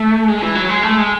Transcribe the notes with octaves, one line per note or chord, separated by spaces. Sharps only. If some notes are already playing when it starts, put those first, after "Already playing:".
Already playing: A3
G#3
E3
F#3
G#3
A3
G#3